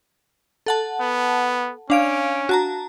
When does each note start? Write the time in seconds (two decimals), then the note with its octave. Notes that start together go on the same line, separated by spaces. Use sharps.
0.66 A4 F#5 A5
1.01 B3
1.90 C#4 D4 F5 D7
2.49 F#4 A5 A#5